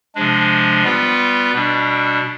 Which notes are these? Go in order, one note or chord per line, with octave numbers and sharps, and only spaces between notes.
C3 F3 G#3 D4
G3 B3 F4 B4
B2 G3 D4